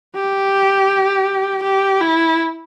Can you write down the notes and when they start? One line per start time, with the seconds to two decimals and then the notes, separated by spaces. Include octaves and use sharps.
0.15 G4
1.63 G4
2.01 E4